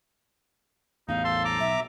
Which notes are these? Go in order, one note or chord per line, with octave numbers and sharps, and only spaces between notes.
A1 E2 D#4 F5
A4 C6
A#5 D6
B1 E5